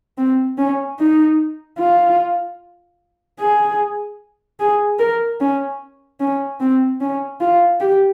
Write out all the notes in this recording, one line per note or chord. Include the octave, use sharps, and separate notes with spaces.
C4
C#4
D#4
F4
G#4
G#4
A#4
C#4
C#4
C4
C#4
F4
G4